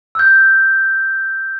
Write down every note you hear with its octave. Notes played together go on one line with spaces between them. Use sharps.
E6 F#6 G6